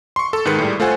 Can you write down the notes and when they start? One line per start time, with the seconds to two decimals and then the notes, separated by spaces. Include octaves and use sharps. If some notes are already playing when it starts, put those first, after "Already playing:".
0.16 C6 C#6
0.33 A4
0.45 G#2 D#3 G#3 B4 C#7
0.58 A2 G3
0.80 A3 F4 A4 C5 F#5 G#5